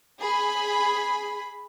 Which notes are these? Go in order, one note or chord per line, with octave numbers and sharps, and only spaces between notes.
G#4 B5